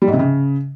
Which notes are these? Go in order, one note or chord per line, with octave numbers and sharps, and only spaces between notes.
G3
G#2
C3
C#3